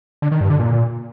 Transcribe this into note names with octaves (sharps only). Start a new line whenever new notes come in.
D3
D#3
G2
D3
A#2